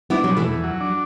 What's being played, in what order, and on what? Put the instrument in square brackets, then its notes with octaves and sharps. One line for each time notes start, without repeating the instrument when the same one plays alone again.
[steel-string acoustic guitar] B3 E4 [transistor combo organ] D4
[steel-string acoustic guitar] F#3
[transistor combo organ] B2
[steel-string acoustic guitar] E3 A3
[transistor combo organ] E2
F#3
D4